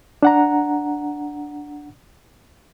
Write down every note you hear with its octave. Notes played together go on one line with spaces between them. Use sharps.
D4 F#5 A#5